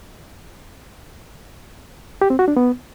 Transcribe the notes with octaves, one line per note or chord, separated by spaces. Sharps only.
G4
C4
F#4
D4
B3